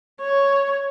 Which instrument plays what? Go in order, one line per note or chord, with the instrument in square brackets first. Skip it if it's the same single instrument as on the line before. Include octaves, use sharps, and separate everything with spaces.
[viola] C#5